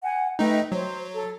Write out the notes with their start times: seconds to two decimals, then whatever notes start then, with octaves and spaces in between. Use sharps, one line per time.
0.02 F#5 G#5
0.39 A3 D#4 B4 D#5 G5
0.72 F#3 C5
1.13 A4